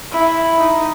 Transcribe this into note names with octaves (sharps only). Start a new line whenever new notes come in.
E4
D#4